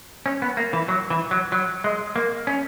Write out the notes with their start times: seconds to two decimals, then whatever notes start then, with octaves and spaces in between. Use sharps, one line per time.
0.26 C#4
0.42 B3
0.57 A#3
0.73 E3
0.88 F#3
1.10 E3
1.31 F#3
1.52 F#3
1.84 G#3
2.16 A#3
2.47 C#4